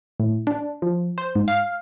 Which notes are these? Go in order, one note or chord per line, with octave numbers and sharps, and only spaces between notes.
A2
D4
F3
C5
G#2
F5